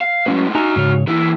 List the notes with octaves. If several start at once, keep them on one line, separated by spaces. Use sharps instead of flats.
F5
A2 F#3 G#3 C#4 B4
D#4 F#4 E5 G#5 A#5
G#2 C#3 C#5
A#2 E3 E4